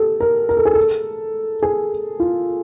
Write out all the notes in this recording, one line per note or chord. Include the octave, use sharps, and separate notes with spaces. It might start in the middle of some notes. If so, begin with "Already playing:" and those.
Already playing: G4 A4
A#4
A#4
A4
G#4
A4
G#4
F4